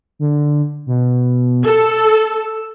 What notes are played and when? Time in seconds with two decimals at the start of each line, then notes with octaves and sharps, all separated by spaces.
0.19 D3
0.86 B2
1.65 A4 E6